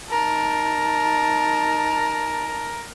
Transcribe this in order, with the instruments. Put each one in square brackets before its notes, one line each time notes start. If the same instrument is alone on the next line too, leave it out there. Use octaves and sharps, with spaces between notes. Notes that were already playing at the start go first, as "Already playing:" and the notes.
[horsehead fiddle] D#4 A5 [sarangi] A#4